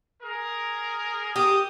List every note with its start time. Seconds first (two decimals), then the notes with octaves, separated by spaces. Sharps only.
0.22 G#4 A#4
1.36 G4 D#6